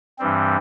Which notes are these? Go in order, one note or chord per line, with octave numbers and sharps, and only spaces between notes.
G2 E3 G3 C4